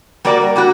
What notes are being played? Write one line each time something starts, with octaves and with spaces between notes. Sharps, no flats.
G3 A#3 F#4 A#4 D5
G3 A#3 F#4